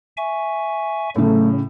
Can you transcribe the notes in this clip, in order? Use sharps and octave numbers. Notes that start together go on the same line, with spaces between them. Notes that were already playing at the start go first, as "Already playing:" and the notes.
E5 G#5 C#6
A2 C#3 F#3 A3